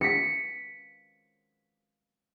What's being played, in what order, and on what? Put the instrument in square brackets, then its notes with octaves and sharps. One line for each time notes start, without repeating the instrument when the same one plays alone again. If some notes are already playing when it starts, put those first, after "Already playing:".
[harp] B6 C#7